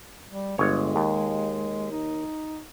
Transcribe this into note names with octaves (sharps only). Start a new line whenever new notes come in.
G3
G1 G#3 C#5
D#2
D#4